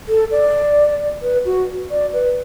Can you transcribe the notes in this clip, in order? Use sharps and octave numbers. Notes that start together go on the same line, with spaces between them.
A4
D5
B4
F#4
D5
B4